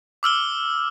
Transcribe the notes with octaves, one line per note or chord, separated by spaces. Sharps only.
D6 E6 F6 G7